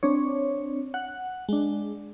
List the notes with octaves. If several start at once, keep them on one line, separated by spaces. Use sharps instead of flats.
C4 D4 C#5
F#5
G#3 D4